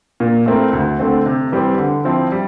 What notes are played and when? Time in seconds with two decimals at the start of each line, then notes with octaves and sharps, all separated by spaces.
0.20 A#2
0.46 A3 C4 E4 A#4
0.73 D2
1.00 D3 A3 C4
1.26 C3
1.52 E3 G3 C4
1.78 D3
2.05 F3 C4 E4
2.32 G3